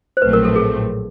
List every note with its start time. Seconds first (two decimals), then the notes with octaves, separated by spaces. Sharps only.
0.17 C5
0.22 A#1 A2 F#3 A3 C4 B4
0.33 A#4
0.45 A4
0.56 G#4